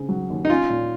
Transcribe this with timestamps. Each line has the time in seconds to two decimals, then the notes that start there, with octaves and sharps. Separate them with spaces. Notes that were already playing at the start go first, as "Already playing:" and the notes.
Already playing: C#3 C4
0.09 F#3
0.30 D#2
0.45 D#4
0.49 C#4 F4
0.69 A#2